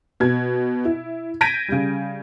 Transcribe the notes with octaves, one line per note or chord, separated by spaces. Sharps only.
B2 G#6
E4
G6 G#6 A#6 B6 D7 D#7
C#3 G3